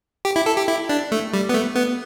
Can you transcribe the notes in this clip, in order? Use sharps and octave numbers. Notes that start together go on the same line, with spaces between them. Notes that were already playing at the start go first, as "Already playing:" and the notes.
G4
E4
A4
G4
E4
D4
A3
G3
B3
A3
B3